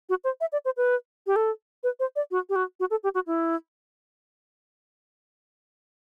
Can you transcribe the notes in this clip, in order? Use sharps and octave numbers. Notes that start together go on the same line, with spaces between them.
F#4
C5
E5
D5
C5
B4
G4
A4
B4
C5
D5
F#4
G4
F#4
F#4
A4
G4
F#4
E4